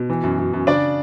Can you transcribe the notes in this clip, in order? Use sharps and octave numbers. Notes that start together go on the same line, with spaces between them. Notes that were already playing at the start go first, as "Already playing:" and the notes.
Already playing: B2
E3
F#2
F#2
F#2
C#3 D4 D5